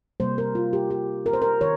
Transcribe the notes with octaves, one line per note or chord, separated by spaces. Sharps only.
C3 G3 A#3 C5
A#4
F4
G4
G4
A#4
C5
A#4
D#3 C#5